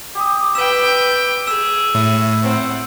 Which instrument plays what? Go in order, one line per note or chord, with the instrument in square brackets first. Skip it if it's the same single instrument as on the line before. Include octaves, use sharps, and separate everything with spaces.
[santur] G4 D#6
[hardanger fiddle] B4 G5 [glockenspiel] E6 E7
[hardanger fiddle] G#4 [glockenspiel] E6 E7
[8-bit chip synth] A2 [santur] E5
[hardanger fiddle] C4 F#5